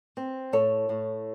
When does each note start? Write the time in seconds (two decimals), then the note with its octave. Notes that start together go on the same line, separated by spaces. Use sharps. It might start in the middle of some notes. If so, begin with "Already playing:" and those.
0.17 C4
0.53 A2 A4 C#5
0.89 A2